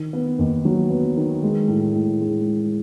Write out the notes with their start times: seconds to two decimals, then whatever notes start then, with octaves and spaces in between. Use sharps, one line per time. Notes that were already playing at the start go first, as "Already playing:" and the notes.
Already playing: D#3
0.13 B3
0.39 D#2
0.65 F#3
0.90 B3
1.17 D#3
1.43 G#3
1.68 A2
1.95 A2
2.20 G#3
2.46 G#3